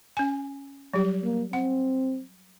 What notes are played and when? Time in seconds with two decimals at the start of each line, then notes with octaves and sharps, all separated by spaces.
0.17 C#4 G#5
0.94 F#3 G3 G4
1.24 A#3
1.53 C4 F#5